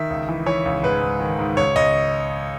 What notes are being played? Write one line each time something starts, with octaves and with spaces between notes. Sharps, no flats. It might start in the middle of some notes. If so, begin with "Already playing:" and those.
Already playing: D#3 E5
C#2
E3
E3 C#5
C#2
G#2 B4
G#2
D#3
G#2
C#2 C#5
C#2 D#5